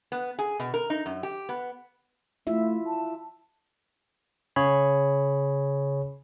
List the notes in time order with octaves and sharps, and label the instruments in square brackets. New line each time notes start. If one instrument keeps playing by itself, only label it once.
[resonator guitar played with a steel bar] B3
G#4
B2
A#4
D#4
F#2
G4
B3
[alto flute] A3 [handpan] E4 F4 E5
[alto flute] A5
[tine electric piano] C#3 G#4 C#5 B5